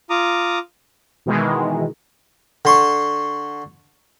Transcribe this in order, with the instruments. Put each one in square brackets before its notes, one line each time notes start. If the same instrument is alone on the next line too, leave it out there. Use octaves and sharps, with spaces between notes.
[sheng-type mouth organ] F4 A#5 D6 D#6
[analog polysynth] B2 D#3 E3 G#3
[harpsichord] D3 C6 C#6